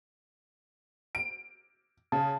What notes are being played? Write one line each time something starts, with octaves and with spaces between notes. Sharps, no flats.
D7
C#3 A5